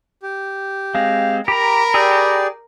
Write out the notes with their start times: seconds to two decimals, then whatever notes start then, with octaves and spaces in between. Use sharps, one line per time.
0.23 G4
0.95 G#3 C4 F5
1.48 G4 A#4 A#5 B5
1.94 G4 G#4 D5 G5 E6